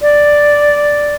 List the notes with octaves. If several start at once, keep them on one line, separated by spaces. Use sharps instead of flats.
D5